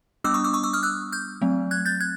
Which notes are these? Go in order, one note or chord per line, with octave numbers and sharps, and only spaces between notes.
G3 B3 D4 D6 E6
C#6 D#6
D6 E6
C#6 D#6
D6 E6
D#6 F6
E6 F#6
F6 G6
F#3 A3 C4
F#6 G#6
G6 A6
F#6 G#6